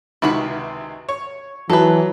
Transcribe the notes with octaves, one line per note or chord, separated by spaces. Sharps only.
C#2 C3 D#3 E4 F#4 B4
C#5
E3 F#3 A4 B4